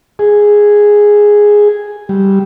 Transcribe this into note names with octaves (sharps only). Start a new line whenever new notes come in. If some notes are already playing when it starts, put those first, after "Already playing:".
G#4
G3